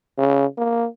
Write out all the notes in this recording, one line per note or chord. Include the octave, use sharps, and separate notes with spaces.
C#3
A#3